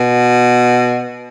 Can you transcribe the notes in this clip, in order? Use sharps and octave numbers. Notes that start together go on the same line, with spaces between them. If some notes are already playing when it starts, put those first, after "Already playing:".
Already playing: B2